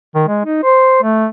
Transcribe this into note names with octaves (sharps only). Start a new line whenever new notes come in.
D#3
G#3
D#4
C5
A3